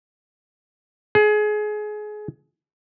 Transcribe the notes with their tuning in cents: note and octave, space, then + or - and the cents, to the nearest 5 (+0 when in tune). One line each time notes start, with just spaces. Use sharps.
G#4 +25